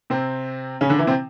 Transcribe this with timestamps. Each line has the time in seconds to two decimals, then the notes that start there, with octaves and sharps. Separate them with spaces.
0.10 C3 C4
0.81 C#3 C#4
0.89 D3 D4
0.99 E3 E4
1.07 C3 C4